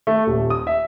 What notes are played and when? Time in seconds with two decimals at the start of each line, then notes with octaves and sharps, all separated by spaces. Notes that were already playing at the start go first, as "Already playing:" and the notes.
0.07 A3
0.27 D#1
0.50 D#6
0.67 E5